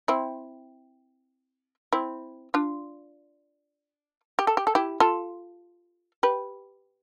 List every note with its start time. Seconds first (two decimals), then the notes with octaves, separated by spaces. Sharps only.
0.08 C4 E4
1.93 C4 E4
2.54 D4 F4
4.39 G4
4.47 A4
4.57 G4
4.67 A4
4.75 E4 G4
5.00 F4 A4
6.23 G4 B4